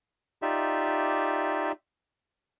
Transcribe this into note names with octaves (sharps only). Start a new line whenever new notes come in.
D#4 F4 G4 D5 E5